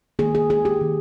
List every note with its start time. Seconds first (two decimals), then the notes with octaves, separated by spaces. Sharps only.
0.19 D#3 A#3 G#4
0.35 G#4
0.50 G#4
0.65 G4
0.81 D#3 A#3